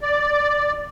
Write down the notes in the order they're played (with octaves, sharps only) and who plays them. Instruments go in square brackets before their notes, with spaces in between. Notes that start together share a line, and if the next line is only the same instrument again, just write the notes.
[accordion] D5